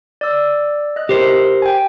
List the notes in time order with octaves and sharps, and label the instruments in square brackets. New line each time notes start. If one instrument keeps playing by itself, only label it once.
[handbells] D5 E6
D#5 F#6
[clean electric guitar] G4 A#4 C5
[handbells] G5 G#5